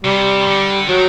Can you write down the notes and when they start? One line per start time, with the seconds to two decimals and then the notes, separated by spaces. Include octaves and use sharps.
0.04 C3 G3
0.46 D3
0.89 D#3 F#3